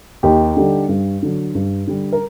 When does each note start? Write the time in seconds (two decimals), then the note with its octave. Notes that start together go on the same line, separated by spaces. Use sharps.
0.23 D#2 D#4 G4
0.57 D3 G3
0.89 G2
1.23 D3 F#3
1.55 G2
1.87 D3 G3
2.12 A#4